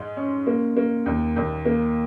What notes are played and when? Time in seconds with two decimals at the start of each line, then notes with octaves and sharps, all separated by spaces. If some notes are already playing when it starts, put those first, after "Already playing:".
Already playing: G#2 G#3
0.17 C#4
0.47 A#3
0.77 A#3
1.06 D#2
1.36 D#2
1.65 A#3